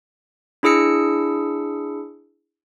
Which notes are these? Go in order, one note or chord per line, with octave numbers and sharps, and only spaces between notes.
D4 E4 G#4 E6 C#7